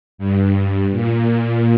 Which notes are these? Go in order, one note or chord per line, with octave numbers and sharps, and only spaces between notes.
G2
A#2